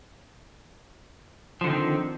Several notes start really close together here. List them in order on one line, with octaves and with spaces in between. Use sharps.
F3 D3 D#3 C4